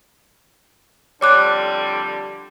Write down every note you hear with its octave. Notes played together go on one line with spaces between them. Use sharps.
F2 D3 G3 C#5 D6 F#6